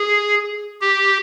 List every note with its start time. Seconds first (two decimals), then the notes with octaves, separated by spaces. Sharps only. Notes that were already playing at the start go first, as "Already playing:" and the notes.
Already playing: G#4
0.81 G4